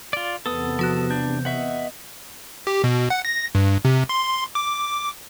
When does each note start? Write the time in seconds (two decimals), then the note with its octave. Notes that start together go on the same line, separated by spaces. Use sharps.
0.13 F4 D5
0.46 E2 C3 B3 A4 D#6
0.79 F3 F#4 F#6
1.10 D4 G6
1.45 D#5 E5 F#5 C#6
2.67 G4
2.84 B2
3.10 F#5
3.25 A#6
3.55 G2
3.85 C3
4.09 C6
4.55 D6